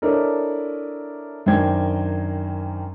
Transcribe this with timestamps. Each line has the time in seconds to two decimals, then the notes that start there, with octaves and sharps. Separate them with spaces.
0.02 D4 E4 A4 A#4 C#5 D#5
1.46 F#2 D#3 D4 C5 G5 G#6